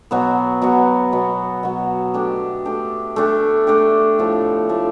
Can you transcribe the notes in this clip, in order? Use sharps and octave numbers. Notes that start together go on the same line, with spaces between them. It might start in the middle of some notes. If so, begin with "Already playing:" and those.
B2 F#3 B3
B2 F#3 B3
B2 F#3 B3
B2 F#3 B3
A3 D4 G4
A3 D4 G4
A3 D4 G4
A3 D4 G4
A2 F3 A3 D4
A2 F3 A3 D4